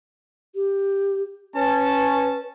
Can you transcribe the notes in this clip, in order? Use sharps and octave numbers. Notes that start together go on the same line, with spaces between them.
G4
C#4 B4 A5